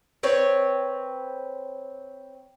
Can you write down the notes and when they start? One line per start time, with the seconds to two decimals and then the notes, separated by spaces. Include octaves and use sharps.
0.23 C4 B4 C#5